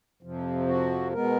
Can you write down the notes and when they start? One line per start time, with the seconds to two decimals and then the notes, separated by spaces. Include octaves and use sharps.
0.23 F2 C3 F3
0.67 F#4
1.13 B2 G#3 B3 A#4